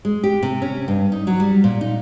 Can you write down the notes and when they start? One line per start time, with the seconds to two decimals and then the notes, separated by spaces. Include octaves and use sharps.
0.05 G#3
0.23 G4
0.43 C3
0.62 C#4
0.88 G2
1.12 D#4
1.27 F#3
1.40 G3
1.64 A#2
1.81 D#4